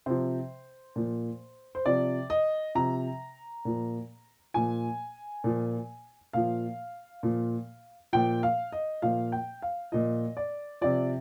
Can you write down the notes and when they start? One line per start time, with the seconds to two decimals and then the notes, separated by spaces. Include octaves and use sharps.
0.06 C3 F3 C5
0.96 A#2 F3
1.75 C5
1.85 C3 F3 D5
2.30 D#5
2.75 C3 F3 A#5
3.65 A#2 F3
4.54 A#2 F3 G#5
5.44 A#2 F3
6.33 A#2 F3 F5
7.23 A#2 F3
8.13 A#2 F3 G5
8.43 F5
8.72 D#5
9.02 A#2 F3 F5
9.32 G5
9.62 F5
9.92 A#2 F3 D#5
10.37 D5
10.81 C3 F3 D5